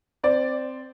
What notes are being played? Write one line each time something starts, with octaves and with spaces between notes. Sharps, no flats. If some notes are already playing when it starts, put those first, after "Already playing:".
C4 D5